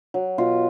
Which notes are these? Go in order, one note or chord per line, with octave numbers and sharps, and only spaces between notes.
F#3
B2 F4